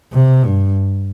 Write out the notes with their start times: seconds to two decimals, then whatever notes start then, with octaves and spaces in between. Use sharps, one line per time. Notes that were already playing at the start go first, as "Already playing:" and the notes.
0.13 C3
0.44 G2